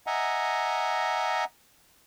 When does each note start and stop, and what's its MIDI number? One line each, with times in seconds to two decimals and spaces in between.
0.07 1.44 75
0.07 1.44 76
0.07 1.44 78
0.07 1.44 80
0.07 1.44 82